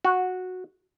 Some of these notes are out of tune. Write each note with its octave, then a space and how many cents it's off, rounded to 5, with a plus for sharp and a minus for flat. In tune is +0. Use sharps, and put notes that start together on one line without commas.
F#4 -10